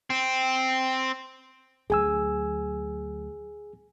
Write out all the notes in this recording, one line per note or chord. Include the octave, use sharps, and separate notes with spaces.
C4
D2 F#3 G#4 G#5 E6